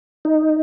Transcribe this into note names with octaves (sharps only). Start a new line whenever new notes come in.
D#4